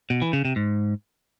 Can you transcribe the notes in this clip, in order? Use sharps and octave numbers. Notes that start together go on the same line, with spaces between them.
B2
E3
C#3
C3
G#2